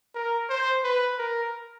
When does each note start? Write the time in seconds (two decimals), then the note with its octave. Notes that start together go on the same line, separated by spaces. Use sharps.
0.15 A#4
0.49 C5
0.84 B4
1.18 A#4